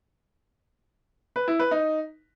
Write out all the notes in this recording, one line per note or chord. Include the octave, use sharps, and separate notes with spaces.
B4
E4
B4
D#4